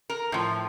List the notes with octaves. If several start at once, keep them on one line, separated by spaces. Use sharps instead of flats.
A#4
A2 F3